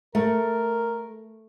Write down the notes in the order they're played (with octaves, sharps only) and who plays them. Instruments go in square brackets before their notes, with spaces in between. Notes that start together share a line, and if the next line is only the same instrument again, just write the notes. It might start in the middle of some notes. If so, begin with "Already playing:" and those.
[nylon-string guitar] A3 [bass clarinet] A#4